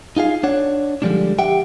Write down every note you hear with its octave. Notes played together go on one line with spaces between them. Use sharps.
D#4 F4 G#4 F5
D4 C#5 F#5
D3 F3 G3 G#3 D4
G4 E5 F#5 G5